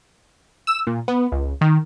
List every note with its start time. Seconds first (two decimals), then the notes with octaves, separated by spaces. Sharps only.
0.67 E6
0.87 A#2
1.08 B3
1.32 C#2
1.61 D#3